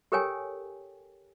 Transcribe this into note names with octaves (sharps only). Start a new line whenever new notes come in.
G4 A4 A#4 C#5 G5 G#5